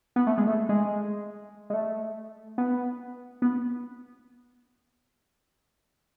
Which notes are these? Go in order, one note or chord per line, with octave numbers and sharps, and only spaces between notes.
B3
A3
G#3
A3
G#3
G#3
A3
B3
B3